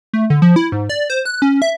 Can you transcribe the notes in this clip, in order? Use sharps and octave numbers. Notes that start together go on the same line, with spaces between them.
A3
D3
F3
E4
G#2
D5
C5
F#6
C#4
E5